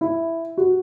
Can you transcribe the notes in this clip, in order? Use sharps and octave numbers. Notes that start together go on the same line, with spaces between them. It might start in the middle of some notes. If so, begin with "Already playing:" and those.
E4
F#4